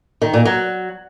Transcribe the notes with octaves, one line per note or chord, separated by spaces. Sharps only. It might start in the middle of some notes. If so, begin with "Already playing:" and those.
D#3
A#2
F#3